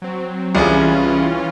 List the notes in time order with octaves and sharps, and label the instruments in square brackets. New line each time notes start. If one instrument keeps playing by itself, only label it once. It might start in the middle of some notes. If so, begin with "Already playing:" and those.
[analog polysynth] F#3 C4
[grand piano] C2 G#4 [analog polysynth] E3 C#4 F4